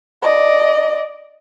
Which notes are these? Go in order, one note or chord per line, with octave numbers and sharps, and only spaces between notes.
D5 D#5